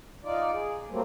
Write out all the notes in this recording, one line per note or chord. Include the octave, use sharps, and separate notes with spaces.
D#4 F4 D5
G#4
F#3 G3 A3 A#3 C4